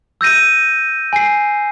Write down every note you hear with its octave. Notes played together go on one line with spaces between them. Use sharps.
E6 G6 A#6 D#7
G#5 C7